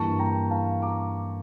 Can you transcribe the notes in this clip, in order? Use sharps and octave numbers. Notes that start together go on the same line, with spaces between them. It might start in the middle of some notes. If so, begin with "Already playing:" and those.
Already playing: G2 E3 A#3 A5 C#6
G5 A#5
F5 A5
A#5 D6